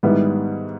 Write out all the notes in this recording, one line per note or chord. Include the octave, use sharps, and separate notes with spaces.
G#2 D#3 G3 B3 E4